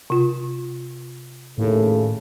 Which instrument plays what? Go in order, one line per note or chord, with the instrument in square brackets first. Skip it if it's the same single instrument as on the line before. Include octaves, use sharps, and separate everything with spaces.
[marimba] C3 F4
[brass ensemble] D#2 C#3 A3 [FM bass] A2